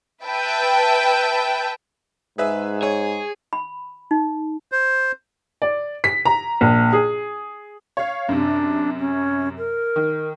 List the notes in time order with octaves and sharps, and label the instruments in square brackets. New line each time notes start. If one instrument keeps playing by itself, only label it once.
[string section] B4 E5 G5 A5
[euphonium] G#2 [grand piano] G#4 B4 E5
[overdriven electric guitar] G#4 [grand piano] C#5
[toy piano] B5
D#4
[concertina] C5
[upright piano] D5
B6
A#5
A#1
G#4
[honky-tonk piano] C#5 F5
[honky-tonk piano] F#2 C3 [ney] D4
[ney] C#4
A#4
[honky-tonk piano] D#3